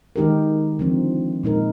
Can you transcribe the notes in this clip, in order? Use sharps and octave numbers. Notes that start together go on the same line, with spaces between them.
D#3 G#3 D#4 G4 A#4
D3 F3 C4
A#2 G#3 D#4 A#4